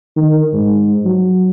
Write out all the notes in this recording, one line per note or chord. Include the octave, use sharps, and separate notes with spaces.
D#3
G#2
F#3